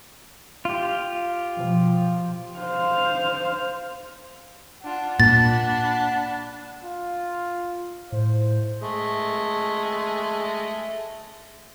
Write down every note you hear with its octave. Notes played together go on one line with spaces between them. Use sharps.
F4 G4
B2 F3
C5 F5
D4 F4 F#5
A#2 D4 A5 B5 A6
F4
A2 C5
G#3 A3